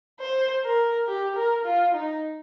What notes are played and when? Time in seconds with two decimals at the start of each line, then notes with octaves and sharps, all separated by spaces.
0.21 C5
0.65 A#4
1.08 G4
1.37 A#4
1.66 F4
1.95 D#4